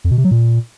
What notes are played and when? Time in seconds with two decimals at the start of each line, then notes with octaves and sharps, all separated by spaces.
0.04 F2
0.11 B2
0.18 C3
0.25 F#3
0.31 A#2